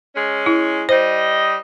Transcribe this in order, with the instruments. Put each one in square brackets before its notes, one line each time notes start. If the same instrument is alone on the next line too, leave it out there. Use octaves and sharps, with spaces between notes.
[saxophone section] G#3 C#4
[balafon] E4
[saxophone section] G3 D#5 [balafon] C5